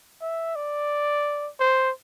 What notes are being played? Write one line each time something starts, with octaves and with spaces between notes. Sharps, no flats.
E5
D5
C5